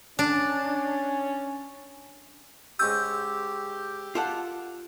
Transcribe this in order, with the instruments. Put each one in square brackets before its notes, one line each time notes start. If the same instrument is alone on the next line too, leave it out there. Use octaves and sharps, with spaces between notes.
[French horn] C#4 [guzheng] D4
[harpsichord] G#2 C#4 D#6 [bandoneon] G4 [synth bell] E6 G6
[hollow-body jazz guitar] F4 A4 F#5 [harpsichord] D5